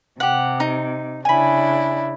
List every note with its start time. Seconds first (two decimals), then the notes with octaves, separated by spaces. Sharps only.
0.20 C3 G4 F#5
0.60 D#4
1.25 C#3 D4 E4 G#5 B5